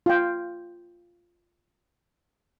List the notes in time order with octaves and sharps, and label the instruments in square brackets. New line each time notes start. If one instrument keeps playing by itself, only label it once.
[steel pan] F4 G5